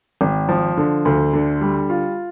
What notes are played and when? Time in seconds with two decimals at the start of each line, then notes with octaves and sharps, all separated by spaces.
0.21 G#1
0.49 F3
0.77 D3
1.05 D2
1.33 D3
1.61 G3
1.90 F4